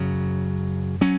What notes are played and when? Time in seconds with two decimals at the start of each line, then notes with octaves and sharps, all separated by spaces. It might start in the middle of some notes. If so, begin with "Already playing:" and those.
Already playing: F#2 C#3 F#3
1.01 F#3 C#4